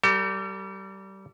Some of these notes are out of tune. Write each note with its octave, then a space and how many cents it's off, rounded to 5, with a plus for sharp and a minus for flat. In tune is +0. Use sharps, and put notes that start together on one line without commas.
G3 -20 A4 +45